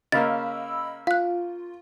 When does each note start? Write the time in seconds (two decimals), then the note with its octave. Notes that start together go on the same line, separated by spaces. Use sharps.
0.12 C#3 A#3 D#5 B5 E6 A6
1.07 F4 F5 F#6